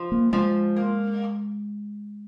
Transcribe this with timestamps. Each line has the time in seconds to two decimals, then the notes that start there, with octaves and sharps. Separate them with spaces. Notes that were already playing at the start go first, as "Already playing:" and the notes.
Already playing: F3
0.12 A#3
0.33 F3 G#3
0.76 A#3